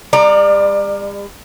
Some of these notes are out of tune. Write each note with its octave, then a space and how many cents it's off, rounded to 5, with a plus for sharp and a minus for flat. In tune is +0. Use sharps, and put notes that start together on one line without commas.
G3 +45 D5 +25 A#5 -5